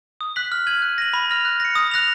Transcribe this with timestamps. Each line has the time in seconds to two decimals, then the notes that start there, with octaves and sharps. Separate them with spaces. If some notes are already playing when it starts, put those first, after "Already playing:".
0.21 D#6
0.36 F#6 B6 F#7
0.52 F6
0.67 G#6 D#7 F#7
0.82 F#6
0.98 A#6 D#7 F#7
1.13 B5
1.30 F6 A#6 F7
1.45 F#6
1.60 A#6 C#7
1.75 D#6
1.91 F#6 A#6 F7